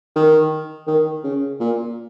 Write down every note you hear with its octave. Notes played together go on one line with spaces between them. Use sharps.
D#3
D#3
C#3
A#2